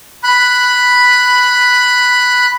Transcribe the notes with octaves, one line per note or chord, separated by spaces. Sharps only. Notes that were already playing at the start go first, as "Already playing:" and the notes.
B5 F#6